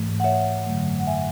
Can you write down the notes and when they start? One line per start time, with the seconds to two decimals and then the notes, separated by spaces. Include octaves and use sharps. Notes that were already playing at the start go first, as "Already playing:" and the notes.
Already playing: G#2 E3 A3
0.20 F#5
0.24 C#5 E5
0.66 F#2 D3 F#3 A3
0.99 F#5
1.07 E5 G#5